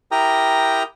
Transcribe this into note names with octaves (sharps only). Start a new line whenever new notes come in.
E4 G4 A#4 G5 A#5 D#6